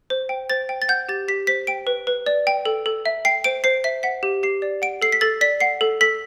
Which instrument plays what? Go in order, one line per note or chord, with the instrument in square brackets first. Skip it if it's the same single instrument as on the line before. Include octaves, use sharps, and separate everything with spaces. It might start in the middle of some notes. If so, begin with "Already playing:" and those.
[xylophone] C5
G5
C5 A6
G5
A6
F#5 G6
G4 A6
G4 B6
C5 B6
G5 D7
B4
B4
D5
G5
A4
A4
E5
G5 C7
C5 D7
C5 C7
E5 B6
F#5 B6
G4
G4 C7
D5
F#5 D7
A4 C7
B6
A4 A6
D5 B6
F#5 C7
A4
A4 B6